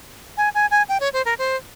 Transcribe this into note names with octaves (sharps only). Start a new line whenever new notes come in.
G#5
G#5
G#5
G5
C#5
C5
A#4
C5